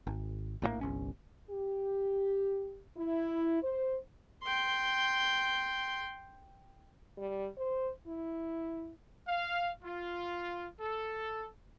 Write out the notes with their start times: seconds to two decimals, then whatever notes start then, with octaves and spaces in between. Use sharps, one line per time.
0.07 G#1
0.62 A#1 A2 E3 A#3
0.81 G1 C2 C#4
1.50 G4
2.97 E4
3.62 C5
4.43 G5 C6
7.17 G3
7.57 C5
8.07 E4
9.27 F5
9.84 F4
10.80 A4